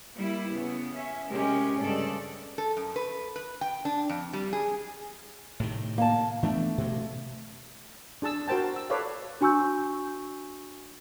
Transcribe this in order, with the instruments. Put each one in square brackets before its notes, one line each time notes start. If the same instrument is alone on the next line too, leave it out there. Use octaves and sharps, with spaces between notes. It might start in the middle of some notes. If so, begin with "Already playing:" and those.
[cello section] G3 A#3 E4
C#3 B3
C#4 E5
C3 G#3 C#4 G4 A#4
G2 C#3 G#3 A4 D5
[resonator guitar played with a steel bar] A4
F#2
B4
B4
G5
D4
F2
G3
G#4
[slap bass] A2 C3 D#3
[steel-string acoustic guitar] A#3 A5
[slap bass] E3 B3 D4 [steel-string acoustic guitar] A3
[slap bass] G2 B2
[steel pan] D4 G#4 A5 E6
F#4 A#4 C5 G5 A5
E6
A4 B4 C#5 D5 F5
[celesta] D4 F#4 G#5 C#6 E6 G6